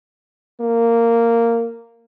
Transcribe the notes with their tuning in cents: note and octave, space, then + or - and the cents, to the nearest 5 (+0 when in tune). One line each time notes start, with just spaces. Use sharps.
A#3 -10